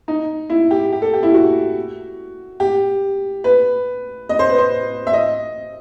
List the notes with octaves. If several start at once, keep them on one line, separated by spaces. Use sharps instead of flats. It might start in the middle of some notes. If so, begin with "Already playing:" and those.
D#4
E4
G4
G4
A4
G4
E4
F#4
G4
B4
D#5
C5
B4
C5
E5
D#5